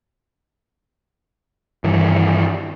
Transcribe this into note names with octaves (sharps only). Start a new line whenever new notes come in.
G2 D#3 E3